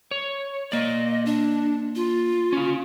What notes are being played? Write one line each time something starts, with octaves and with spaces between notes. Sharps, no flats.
C#5
A#3 D5 D#5
D4
F4
C#4 F5